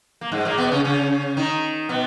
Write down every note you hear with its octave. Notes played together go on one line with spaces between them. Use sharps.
A#3
G#2 G#3
A#2 A#3
B2 B3
C#3 C#4
C#3 C#4
D#3 D#4
B2 B3